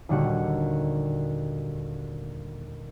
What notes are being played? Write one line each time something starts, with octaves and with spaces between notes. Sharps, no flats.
D#2 A#2 D3 G3 F#4 F#5